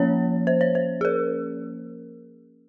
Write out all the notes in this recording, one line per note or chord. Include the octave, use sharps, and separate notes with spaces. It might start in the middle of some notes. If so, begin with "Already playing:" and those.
Already playing: F3 A#3 C#4 C#5
C5
C#5
C5
G#4
A#4